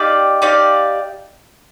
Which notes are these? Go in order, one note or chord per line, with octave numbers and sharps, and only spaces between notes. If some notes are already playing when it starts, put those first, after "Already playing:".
Already playing: D#4 G4 D5 F5
D#4 G4 D5 F5